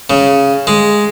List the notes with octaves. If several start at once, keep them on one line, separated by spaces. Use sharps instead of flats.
C#3
G#3